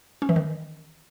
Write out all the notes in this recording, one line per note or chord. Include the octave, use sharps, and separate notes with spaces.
C#4
E3
D#3